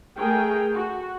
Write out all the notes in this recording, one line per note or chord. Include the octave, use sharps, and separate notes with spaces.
A3 G#4 A#4 G5
F#4